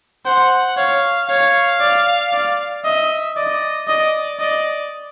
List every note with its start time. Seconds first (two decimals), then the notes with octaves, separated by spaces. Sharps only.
0.26 C5 F#5
0.77 C#5 F5
1.29 C#5 F5
1.81 D5
2.33 D5
2.84 D#5 E5
3.36 D5 D#5
3.88 D5 D#5
4.40 D5 D#5